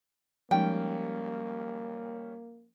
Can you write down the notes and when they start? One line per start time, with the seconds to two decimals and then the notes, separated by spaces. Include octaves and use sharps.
0.51 F3 G3 G#3 A#3 C#4 D#4 G5